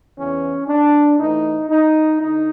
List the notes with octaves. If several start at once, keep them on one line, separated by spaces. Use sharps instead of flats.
E2 C#3 E3 C#4
D4
A2 E3 D#4
D#4
D3 D#4